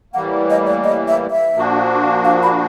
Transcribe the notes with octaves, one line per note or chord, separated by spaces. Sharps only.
A2 E3 G3 A#3 F#5
D#5
D5
D#5
E5
E5
A#2 F3 A#3 D4 F#4
F5
B5